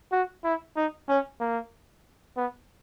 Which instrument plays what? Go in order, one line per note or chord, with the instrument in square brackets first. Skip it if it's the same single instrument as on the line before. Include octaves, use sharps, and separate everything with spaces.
[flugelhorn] F#4
E4
D#4
C#4
A#3
B3